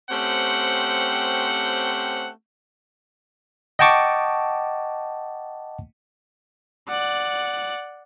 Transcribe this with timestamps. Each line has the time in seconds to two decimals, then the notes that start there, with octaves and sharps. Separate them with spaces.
0.10 A3 C4 C#4 G4 C5 F#5
3.79 D#5 F#5 G5 A5 C#6 D6
6.89 D5 F#5